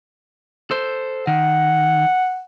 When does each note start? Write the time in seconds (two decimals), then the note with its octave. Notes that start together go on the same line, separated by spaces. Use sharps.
0.71 A4 C5
1.27 D#3 F#5